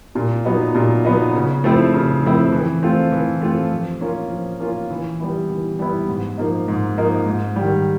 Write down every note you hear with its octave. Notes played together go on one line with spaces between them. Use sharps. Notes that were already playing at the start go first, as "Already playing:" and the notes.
A#2
F#3 B3 D#4
A#2
F#3 B3 D#4
C#3
F3 A3 C4 E4
C#3
F3 A3 C4 E4
E3
A3 C4 F4
E3
A3 C4 F4
F3
A#3 C#4 F4
F3
A#3 C#4 F4
E3
G3 B3 E4
E3
G3 B3 E4
G#2
F3 A#3 D#4
G#2
F3 A#3 D#4
G#2
G3
D#3